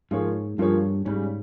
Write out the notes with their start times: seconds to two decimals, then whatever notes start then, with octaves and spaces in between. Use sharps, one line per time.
0.11 G#2 F3 A#3 F4 G#4 C#5
0.58 G2 F3 A#3 F4 G#4 C#5
1.05 G#2 C#3 G3 C#4